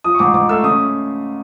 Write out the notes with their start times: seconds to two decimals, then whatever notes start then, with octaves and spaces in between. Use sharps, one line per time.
0.04 F3 D#6
0.15 C#6
0.19 G#2 D6
0.34 G#2 D6
0.49 A3 E6
0.63 C#3 D#6